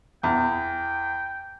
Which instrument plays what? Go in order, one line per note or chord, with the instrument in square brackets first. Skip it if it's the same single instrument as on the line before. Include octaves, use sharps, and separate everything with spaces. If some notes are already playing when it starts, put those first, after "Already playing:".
[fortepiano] E2 [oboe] G5